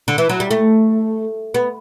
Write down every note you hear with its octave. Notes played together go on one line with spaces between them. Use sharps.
D3
E3
F#3
G3
A3
B3